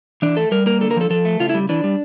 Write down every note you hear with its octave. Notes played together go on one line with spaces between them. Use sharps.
E3 D4
A3 A4
G3 A#4
A#3 A#4
D3 A4
A#4
F3 A4
F3 A4
A3
C#3 F4
E4
G3
E3 D4
G3